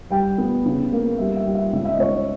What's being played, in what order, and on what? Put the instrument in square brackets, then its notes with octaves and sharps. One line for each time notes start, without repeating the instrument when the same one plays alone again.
[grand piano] G3 G5
B3
C#3
A#3
G3 E5
E5
G3
E5
C#2 E5
E5
D#5
C#2 C#5